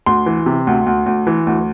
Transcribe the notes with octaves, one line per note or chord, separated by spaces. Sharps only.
D2 C6
E3
C3
D2
D2
D2
E3
D2